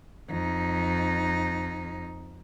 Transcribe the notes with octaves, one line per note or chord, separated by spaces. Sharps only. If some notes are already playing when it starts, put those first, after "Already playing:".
F2 D#4